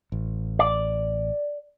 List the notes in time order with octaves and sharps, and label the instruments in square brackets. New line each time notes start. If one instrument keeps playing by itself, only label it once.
[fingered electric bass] A1
[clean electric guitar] D5